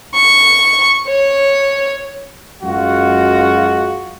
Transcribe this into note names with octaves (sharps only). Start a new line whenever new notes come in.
C#6
C#5
F#2 G#3 F4 F#4